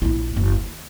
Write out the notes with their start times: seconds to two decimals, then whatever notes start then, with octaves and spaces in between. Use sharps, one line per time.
0.02 A#1 E4
0.36 F#1 E3
0.54 D#2